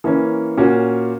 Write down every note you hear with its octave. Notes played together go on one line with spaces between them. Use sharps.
E3 A#3 C#4
A#2 A#3 C#4 F#4